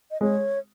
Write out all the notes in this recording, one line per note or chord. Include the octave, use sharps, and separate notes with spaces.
D#5
G#3 C#5